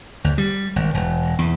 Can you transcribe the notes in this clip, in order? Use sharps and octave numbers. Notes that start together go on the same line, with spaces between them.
D2
G3
G#1
E1
E2